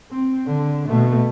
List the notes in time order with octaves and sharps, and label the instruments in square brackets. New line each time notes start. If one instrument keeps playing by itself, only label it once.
[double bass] C4
D3
B2 A3